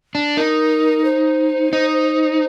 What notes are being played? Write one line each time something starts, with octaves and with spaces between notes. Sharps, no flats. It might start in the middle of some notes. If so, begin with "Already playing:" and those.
D4
D#4 A#4
C5
D#4